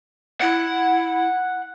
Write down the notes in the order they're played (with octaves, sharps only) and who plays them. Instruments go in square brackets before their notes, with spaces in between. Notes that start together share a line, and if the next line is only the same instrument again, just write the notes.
[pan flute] E4 [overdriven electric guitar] F#5